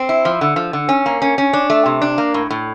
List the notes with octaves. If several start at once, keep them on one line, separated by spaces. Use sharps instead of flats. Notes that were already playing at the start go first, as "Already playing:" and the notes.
Already playing: C4
E4
F3
D3
F3
D3
C#4
A#3
C#4
C#4
D4
A3
C3
D4
A#3
A2
A2